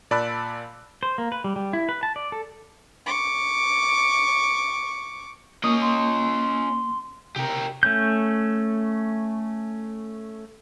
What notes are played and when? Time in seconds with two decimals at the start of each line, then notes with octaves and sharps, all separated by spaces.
0.11 A#2 D5 A5 B5 E6 F#6
1.03 C5
1.18 A#3
1.32 B4
1.44 G3
1.56 G3
1.73 E4
1.89 B4
2.03 A5
2.16 D5
2.32 A4
3.06 C#6 D6
5.64 A#3 C#4 D#5 C#6 D#6
5.81 C6
7.36 C3 G4 A#4
7.83 A3 C#4 G6